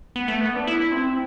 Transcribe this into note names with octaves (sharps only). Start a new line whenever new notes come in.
B3
A3
B3
D4
E4
C4